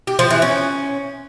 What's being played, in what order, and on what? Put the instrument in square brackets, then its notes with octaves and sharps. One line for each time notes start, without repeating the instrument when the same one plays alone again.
[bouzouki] G4
F3
E3
C#4